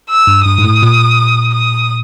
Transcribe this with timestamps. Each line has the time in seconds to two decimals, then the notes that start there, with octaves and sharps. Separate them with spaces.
0.10 E6
0.27 G2
0.45 G2 D#6
0.58 G#2
0.64 A2
0.83 A#2
1.54 D#6